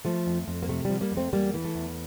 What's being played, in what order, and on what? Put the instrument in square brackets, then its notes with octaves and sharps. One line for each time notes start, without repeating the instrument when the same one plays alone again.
[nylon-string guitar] F3 A3
F2
F2
A#3
C3 A3
F3 G3
G3 A#3
F2
A3 C4
E2 G3 A#3
E3
A3
E2